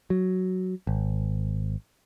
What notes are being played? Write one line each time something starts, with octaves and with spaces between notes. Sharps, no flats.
F#3
G#1